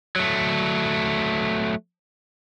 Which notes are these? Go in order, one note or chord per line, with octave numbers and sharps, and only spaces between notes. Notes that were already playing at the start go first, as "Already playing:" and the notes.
F#3 A3